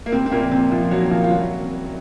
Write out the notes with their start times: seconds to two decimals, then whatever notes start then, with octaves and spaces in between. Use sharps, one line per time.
0.06 A#3
0.12 F#1 C3 C4
0.26 C4
0.31 A#2 A#3
0.42 F2
0.51 C3 C4
0.71 C3 F3 F4
0.91 F#3 F#4
1.01 D#3
1.11 F3 F4
1.24 F4
1.30 C2 F#3 F#4
1.61 C3